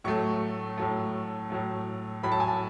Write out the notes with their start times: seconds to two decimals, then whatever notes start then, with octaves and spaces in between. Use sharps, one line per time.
0.04 A2 F#3 A3 C#6
0.78 A2 F#3 A3
1.50 A2 F#3 A3
2.23 A2 F#3 A3 B5
2.32 A5
2.40 G#5
2.48 A5